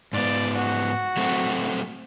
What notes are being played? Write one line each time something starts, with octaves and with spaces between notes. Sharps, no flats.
G#2 B3 D5
F#4
F#3 A3 C4